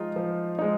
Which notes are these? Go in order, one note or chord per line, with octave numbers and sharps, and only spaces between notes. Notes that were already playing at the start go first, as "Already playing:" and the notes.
Already playing: F3 G#3 D#4 F4
F3
G#3 D#4